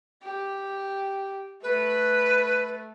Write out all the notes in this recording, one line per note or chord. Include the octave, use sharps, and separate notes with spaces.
G4
A3 B4